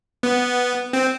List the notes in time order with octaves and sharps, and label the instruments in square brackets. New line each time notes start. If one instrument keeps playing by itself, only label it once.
[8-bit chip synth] B3
C4